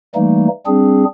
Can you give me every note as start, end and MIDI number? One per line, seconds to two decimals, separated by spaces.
0.15 0.48 52
0.15 0.48 55
0.15 0.48 57
0.15 0.48 58
0.15 0.48 63
0.67 1.05 55
0.67 1.05 60
0.67 1.05 62
0.67 1.05 68